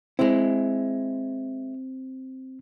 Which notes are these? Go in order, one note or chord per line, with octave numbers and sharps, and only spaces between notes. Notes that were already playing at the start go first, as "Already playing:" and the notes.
G#3 C4 E4